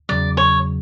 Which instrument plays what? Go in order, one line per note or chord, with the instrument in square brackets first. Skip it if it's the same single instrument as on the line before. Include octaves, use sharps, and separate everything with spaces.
[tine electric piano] E2 C#3 F#3 [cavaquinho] D5
[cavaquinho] C#5